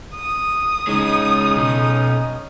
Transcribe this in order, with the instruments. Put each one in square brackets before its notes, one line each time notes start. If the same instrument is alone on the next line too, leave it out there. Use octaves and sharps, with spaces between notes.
[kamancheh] D#6
[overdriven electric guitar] C#3 G#3 [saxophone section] C#4 D#4
[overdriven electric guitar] B1